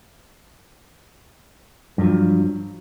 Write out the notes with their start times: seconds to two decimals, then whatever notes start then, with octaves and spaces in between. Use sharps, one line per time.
1.98 G2
2.01 F#3
2.04 F3